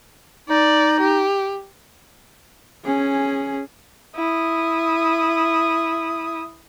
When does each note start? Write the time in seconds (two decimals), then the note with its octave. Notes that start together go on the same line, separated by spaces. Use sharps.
0.49 D#4 D5
1.01 G4
2.85 C#4 G#4
4.15 E4 D#6